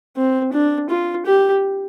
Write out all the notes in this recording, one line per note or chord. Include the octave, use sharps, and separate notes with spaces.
C4
D4
F4
G4